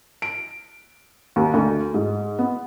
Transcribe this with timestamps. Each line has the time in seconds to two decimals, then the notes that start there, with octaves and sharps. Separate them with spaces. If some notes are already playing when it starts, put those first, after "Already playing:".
0.22 D7
1.36 D#2
1.54 D2
1.94 G#2
2.39 B3